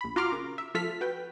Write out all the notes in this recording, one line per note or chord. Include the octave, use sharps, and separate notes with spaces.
A#1 B5
F4 F#4 A#5 C6 D6 F6
C#3 A#4
E5
F3 F4 A4 E5 F6 B6
F#4 B4 G5